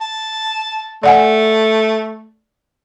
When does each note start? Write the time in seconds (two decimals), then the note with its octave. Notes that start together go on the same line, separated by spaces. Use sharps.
0.01 A5
1.03 A3 D5 F#5 G#5